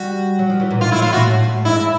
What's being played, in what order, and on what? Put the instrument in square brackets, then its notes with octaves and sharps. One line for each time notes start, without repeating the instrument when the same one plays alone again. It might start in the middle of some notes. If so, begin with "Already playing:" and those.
Already playing: [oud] G3 [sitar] F#4
[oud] F#3
F3
E3
A#2
[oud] A#2 [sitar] F4
[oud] A2 [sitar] E4
[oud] A2 [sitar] F4
[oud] A#2 [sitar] F#4
[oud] A2
A2
[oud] G#2 [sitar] E4